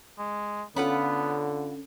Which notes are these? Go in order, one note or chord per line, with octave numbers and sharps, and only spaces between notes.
G#3
D3 B3 C#4 F4 A4 F#5 B5